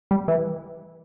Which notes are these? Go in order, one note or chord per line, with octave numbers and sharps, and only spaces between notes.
G3
E3